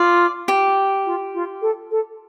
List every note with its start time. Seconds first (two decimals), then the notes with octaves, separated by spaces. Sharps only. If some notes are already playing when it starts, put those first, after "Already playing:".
Already playing: F4 D5
0.48 G4
1.06 F4
1.34 F4
1.62 A4
1.91 A4